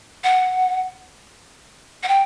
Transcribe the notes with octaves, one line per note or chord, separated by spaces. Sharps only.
F#5
F#5
G5